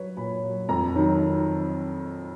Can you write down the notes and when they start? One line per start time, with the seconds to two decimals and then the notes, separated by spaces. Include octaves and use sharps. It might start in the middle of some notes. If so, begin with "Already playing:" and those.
Already playing: F#3 B4 C#5
0.17 A#2 B5
0.44 F#3
0.69 F2 A#5
0.95 D#3 F#3